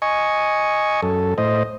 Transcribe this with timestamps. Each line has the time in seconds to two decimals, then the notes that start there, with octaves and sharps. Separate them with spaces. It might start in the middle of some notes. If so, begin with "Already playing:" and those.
0.02 D#5 G#5 C#6
1.02 F#2 A4
1.38 A2 C5 D#5